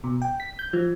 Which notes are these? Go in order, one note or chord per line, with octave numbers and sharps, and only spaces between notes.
B2
G5
B6
G6
F3